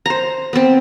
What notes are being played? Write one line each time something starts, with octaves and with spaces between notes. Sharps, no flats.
C5 A#5
B3 C4